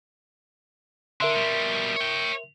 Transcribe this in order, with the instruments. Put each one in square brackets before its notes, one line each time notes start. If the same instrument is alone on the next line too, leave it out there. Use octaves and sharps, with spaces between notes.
[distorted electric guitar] D3 [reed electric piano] A#4 E5 C6
[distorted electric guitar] B2 G3
C#5 G5